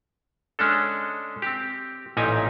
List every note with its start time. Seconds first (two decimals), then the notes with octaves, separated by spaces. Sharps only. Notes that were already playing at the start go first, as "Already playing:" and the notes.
0.59 G#3 C#4 D4 A4
1.42 C4 G4
2.17 A1 A#2 D#4 G4 G#5